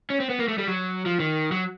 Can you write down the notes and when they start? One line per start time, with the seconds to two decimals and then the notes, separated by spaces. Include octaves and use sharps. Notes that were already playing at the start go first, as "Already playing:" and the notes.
0.10 C#4
0.20 C4
0.29 B3
0.39 A#3
0.48 A3
0.58 G3
0.68 F#3
1.06 F3
1.20 D#3
1.52 F#3